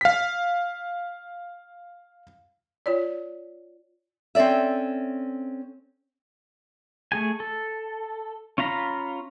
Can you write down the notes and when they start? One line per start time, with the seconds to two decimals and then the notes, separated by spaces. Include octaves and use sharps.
0.01 F5 B6
2.86 F4 C#5 D5
4.35 C4 C#4 A4 D5 E5
7.12 A3 G#4 G#5
7.40 A4
8.58 C#4 F4 F5 A#5 B5